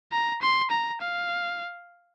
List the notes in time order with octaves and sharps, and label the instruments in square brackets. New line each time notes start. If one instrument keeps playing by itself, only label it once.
[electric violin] A#5
C6
A#5
F5